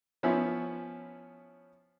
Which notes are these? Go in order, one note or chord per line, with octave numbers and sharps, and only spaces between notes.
F3 B3 C#4 E4